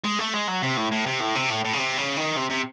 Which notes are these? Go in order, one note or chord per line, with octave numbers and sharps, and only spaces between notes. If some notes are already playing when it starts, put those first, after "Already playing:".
G#3
A3
G#3
F#3
C3
A2
A2
C3
A2
C3
A2
A2
C#3
C3
C#3
D#3
C3
C3